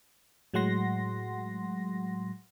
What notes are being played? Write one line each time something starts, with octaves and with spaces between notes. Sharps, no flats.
A2 F#3 G#3 F#5 C6 A#6